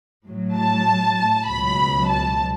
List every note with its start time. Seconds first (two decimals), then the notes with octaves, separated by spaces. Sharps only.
0.26 A2 F#3
0.56 A5
1.48 C#2 B2 F#3 B5
2.09 A5